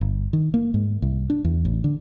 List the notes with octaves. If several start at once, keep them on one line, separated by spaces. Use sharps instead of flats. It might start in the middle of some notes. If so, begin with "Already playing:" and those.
G1
D#3
A#3
G#2
C2
D4
E2
A1
D3